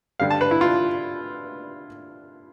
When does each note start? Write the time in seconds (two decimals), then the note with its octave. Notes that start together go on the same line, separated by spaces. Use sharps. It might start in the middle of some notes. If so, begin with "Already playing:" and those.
0.20 G2 D3 G3 F5
0.30 A5
0.41 B4
0.51 E4
0.61 F4